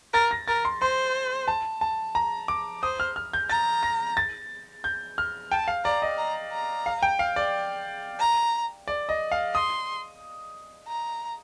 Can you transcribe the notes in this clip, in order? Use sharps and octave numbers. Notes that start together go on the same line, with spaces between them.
A#4 A6
A#6
A#4 A6
C6
C5 C6
A5
A5
A#5
D6
C5 D#6
F6
F6
G6
A#5 A6
A#6
A6
G6
F6
G5 A5
F5
D5 A#5
D#5
A#5
A#5
F5
G5
F5
D5
A#5
D5
D#5
F5
C6 D#6
A#5